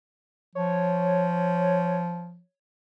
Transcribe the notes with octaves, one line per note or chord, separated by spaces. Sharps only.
F3 C#5